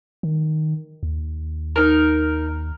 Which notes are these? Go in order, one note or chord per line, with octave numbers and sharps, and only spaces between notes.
D#3
D#2
D#4 A#4